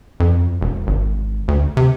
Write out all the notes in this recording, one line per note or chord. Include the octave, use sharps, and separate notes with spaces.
F2
E1
G#1
D2
C3